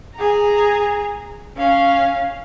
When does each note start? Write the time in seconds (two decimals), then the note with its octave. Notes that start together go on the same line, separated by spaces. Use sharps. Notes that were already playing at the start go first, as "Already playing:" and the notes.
0.15 G#4 A#5
1.57 C#4 F5